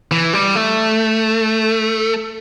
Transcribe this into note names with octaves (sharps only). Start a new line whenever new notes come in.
E3
G3
A3